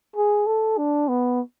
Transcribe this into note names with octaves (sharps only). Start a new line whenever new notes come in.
G#4
A4
D4
B3